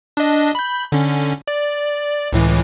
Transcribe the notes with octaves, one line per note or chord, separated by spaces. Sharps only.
D4 D#5
B5 G6
D3 C#4
D5
C#2 A2 E3